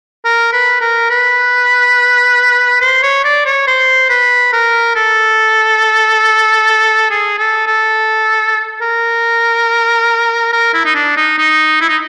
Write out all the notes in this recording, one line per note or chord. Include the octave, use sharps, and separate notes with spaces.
A#4
B4
A#4
B4
C5
C#5
D5
C#5
C5
B4
A#4
A4
G#4
A4
A4
A#4
A#4
E4
D#4
D4
D#4
D#4
E4
D#4